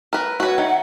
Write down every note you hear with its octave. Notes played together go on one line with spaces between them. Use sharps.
A#4 B4
F#4 B4 C#5 E5 F#5
D#3